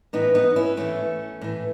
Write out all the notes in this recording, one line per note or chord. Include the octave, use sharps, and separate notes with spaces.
A2 E3 B3 D#4
B3 D#4
C#4 E4
A2 E3 A3 C#4
A2 E3